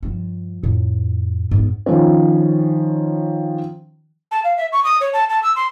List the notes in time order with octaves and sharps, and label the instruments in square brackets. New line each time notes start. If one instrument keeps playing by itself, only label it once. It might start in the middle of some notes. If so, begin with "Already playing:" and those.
[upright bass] G2 F3
F2 A2
G#2 B3
[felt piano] D#3 F3 C#4
[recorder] A5
F5
E5
C#6
D#6
C#5
A5
A5
E6
C6